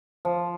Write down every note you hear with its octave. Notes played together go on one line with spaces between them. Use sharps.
F3